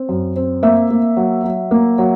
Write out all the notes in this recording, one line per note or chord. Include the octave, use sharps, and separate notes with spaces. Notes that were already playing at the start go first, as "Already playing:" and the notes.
Already playing: C4
F#2
C4
A#3 E5
A#3
F#3
F#3
A#3
F#3